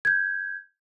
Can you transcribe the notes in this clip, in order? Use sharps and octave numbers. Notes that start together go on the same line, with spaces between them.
G6 G#6